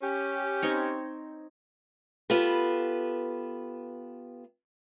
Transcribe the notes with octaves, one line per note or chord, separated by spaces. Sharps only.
C#4 G4
C4 D#4 C#5
B3 F4 G4 A4 B4